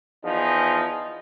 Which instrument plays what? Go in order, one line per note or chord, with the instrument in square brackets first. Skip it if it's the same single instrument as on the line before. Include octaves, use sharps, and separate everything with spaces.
[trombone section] E2 F3 D#4 G#4